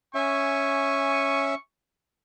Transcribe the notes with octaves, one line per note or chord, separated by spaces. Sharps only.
C#4 E5 G#5 C#6